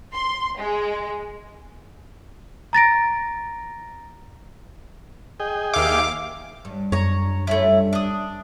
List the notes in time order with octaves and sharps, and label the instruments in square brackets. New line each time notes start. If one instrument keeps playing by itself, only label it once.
[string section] C6
G#3
[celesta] A#5 A6 A#6 D7
[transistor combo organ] G#4 D#5 G5
[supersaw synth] D#2 F5 [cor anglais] E5 [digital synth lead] D6
[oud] G2
[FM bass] F#2 [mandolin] C#5 A#5
[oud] G2 C#4 F4 [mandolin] A3 E4
[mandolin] D4 D#6